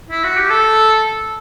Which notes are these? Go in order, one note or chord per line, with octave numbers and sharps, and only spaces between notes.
E4
F#4
G4
A4